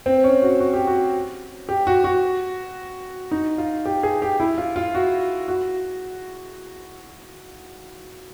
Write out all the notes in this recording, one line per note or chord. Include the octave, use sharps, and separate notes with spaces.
C4
C#4
F#4
F#4
G4
F#4
G4
F#4
F#4
D#4
F4
G4
G#4
G4
E4
F4
F4
F#4
F#4